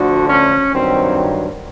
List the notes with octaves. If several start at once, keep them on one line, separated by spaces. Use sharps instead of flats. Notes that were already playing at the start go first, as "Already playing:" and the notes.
Already playing: D2 D3 F3 F#4
C#4
G2 D#3 F#3 C4